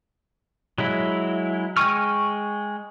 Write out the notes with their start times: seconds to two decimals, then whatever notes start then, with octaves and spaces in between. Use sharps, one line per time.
0.78 F#3 G#3 E4
1.77 G#3 G5 G#5 C#6 F6